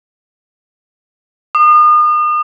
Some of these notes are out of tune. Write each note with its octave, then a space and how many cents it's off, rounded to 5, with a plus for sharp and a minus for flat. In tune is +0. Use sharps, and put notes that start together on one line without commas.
D#6 -40